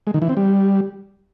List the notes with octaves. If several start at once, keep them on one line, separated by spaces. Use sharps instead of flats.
G#3
D#3
E3
C4
G3